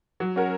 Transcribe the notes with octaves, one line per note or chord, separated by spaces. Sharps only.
F#3
C#4 F#4 A#4